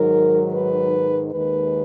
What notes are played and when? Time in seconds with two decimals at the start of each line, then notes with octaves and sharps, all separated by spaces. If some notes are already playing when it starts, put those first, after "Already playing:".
Already playing: G#2 D#3 F#3 A#4
0.53 B4
1.30 D#2 D#3 G#3 B4